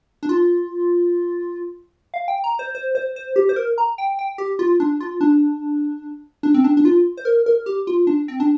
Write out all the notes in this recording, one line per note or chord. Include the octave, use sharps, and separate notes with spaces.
D4
F4
F5
G5
A#5
C5
C5
C5
C5
G4
C5
A#4
A#5
G5
G5
G4
F4
D4
F4
D4
D4
C4
D4
D4
F4
C5
A#4
A#4
G4
F4
D4
C4
D4